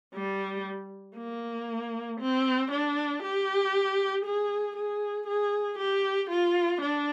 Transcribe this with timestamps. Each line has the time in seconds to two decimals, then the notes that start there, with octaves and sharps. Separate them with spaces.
0.15 G3
1.18 A#3
2.20 C4
2.72 D4
3.23 G4
4.26 G#4
4.77 G#4
5.28 G#4
5.79 G4
6.31 F4
6.82 D4